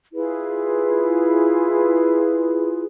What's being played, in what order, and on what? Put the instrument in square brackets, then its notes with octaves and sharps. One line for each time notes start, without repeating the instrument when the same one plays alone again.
[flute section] E4 F4 G#4 B4